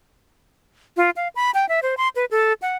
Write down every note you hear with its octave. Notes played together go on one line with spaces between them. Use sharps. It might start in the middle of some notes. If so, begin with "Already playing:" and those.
F4
F5
B5
G5
E5
C5
C6
B4
A4
F#5